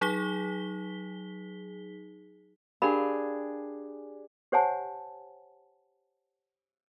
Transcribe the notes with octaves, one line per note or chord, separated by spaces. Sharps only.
F#3 D#4 G#4 B6 G7
D4 G4 G#4 A#4 F5 B5
G4 C5 C#5 F#5 G#5 A5